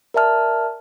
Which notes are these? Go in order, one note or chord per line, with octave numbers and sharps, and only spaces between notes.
A#4 D5 E5 A5 F6